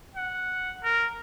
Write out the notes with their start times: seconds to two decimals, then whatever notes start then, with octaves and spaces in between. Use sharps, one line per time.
0.16 F#5
0.84 A#4